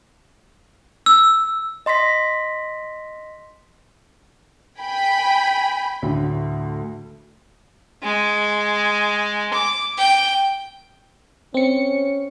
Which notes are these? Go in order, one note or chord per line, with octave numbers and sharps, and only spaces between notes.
E6
D#5 C6 A#6 B6
G5 G#5 B5
D2 A2 D3
G#3
D6
G5
C4 C#4 C#7